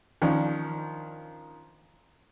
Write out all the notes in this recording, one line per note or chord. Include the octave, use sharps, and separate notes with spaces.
D#3 F3 C#4 D4